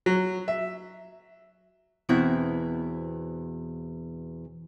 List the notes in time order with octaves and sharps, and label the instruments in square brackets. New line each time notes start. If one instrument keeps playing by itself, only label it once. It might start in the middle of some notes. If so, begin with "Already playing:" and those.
[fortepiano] F#3
E5
[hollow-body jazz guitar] E2 B2 C4 E4